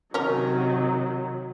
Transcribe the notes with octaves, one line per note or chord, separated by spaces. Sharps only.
C3 D#3 F#3 C#4 A#4